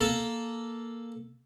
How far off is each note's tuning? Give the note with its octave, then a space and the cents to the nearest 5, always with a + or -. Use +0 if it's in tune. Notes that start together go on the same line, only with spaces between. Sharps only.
A#3 +0 A4 +0 A5 +0